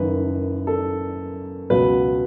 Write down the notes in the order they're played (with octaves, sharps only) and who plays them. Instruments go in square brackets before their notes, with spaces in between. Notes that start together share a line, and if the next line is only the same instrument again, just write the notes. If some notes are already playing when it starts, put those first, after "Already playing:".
Already playing: [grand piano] F#1 F#2 D#3 B4
A4
C#2 B2 F#3 B4